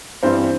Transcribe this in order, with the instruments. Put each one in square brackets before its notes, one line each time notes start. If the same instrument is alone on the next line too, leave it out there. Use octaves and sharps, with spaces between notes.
[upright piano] G2 E3 G3 C4 C5